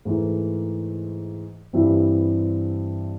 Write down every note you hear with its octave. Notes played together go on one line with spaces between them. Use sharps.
G#2 E3 A3
G2 E3 G3 C4 E4